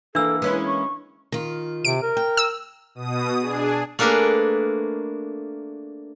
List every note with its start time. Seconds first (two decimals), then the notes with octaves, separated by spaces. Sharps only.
0.15 E3 A#3 D4 A4 E6
0.42 G#3 C#4 E4 B4
0.66 C#6
1.32 D#3 F4
1.85 C3 D7
2.02 A#4
2.17 G5
2.37 E6
2.95 B2 D#6
3.40 D4 G#4
3.99 A3 A#3 D4 G#4 A#4 B4